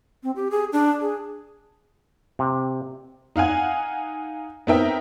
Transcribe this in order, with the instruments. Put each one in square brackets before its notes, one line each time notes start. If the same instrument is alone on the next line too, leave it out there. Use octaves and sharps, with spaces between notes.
[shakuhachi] C4
G4
G#4
D4
G#4
[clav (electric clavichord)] C3
[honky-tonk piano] D#4 F5 F#5 G#5
B3 C4 D#4 A#4 E5 G5